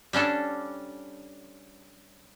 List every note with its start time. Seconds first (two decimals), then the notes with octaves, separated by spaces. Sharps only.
0.13 G3 C#4 D4 A4